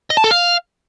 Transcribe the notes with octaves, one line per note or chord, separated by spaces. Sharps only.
D#5
A5
A4
F5